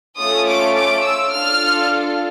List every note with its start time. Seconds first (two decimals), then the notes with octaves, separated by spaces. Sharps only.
0.18 A3 C#4 F4 A4 D#6
0.47 D6
0.75 D6
1.03 E6
1.32 D4 F4 A4 F6